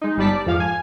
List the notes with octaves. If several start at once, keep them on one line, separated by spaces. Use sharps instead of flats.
G#3 D#4
G1 G3 D#4 D5 A5 B6
D5
F2 G#2 F3 F5
G#5